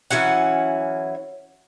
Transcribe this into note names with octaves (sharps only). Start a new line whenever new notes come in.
E3 F#3 C#4 F#5